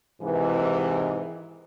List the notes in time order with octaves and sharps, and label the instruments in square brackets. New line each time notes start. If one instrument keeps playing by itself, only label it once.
[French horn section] G#2 C3 D#3 E3